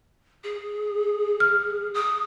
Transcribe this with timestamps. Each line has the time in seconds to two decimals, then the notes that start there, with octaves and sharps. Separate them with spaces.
0.44 G#4
1.40 F6
1.94 D#6